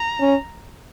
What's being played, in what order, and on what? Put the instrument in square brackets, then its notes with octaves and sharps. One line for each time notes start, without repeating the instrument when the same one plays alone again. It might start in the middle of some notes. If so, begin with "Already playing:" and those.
Already playing: [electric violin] A#5
[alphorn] C#4